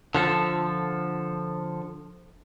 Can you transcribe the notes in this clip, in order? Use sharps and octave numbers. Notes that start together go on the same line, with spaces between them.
D3 F3 A4